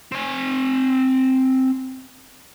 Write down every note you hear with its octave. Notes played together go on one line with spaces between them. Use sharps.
C4 G#5